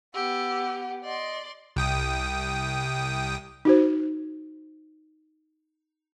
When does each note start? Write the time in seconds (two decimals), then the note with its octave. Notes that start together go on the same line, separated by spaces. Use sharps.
0.14 B3 G4 F#5 E6
1.04 D5 D#5 C6
1.76 C2 G5 D#6
3.65 D#4 F#4 C5